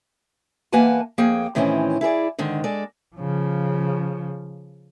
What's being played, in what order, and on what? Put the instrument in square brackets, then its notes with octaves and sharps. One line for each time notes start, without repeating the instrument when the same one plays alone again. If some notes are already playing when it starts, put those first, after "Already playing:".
[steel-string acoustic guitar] E2 A#3 B4 F#5 G#5 A5
F2 A#3 G#4 G5
A2 D#3 E3 C4 C#4
E4 G#4 A#4 D5
G#2 D3 D#3
G#3 A4 D5
[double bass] C#3 F3